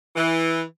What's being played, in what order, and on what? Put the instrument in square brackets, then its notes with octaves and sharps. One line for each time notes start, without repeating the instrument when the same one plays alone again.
[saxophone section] E3